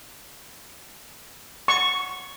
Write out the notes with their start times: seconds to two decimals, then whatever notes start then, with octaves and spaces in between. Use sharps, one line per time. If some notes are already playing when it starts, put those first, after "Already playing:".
1.68 C#6